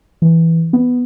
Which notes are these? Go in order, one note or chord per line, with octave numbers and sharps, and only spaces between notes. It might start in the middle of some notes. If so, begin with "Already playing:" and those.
E3
B3